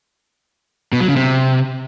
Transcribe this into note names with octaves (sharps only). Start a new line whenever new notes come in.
B2
F#3
C#3
C3